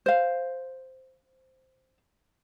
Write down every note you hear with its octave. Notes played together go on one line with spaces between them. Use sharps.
C5 F5